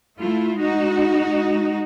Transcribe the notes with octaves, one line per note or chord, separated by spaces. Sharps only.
A3 E4 F4
G#3 D#4 F#4